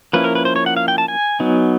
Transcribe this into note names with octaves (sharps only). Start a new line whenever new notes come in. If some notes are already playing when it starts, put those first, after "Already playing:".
F3 A#3 C#4 E4 B4
A#4
B4
C5
C#5
F#5
F5
G5
A5
G#5
F#3 B3 D#4